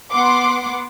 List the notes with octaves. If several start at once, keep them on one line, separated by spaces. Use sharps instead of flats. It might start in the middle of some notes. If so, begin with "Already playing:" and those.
B3 F#5 C6 D6